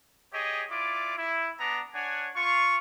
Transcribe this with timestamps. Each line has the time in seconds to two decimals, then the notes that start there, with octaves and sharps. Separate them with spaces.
0.33 G4 G#4 C#5 D#5
0.71 E4 F4 D5 D6
1.17 E4
1.59 B3 D4 A#5
1.94 D4 C#5 F#5 G#5
2.35 F4 C#6